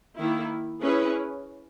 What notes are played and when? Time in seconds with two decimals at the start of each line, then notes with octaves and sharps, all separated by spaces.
0.18 D#3 A#3 E4
0.83 C#4 E4 G#4 B4